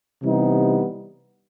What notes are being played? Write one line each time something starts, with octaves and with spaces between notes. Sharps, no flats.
C3 E3 G3 B3 D#4